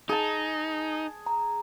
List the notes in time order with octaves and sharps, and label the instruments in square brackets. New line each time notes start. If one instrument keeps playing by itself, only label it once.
[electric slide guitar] D#4 [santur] G#4 A5
[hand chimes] A#5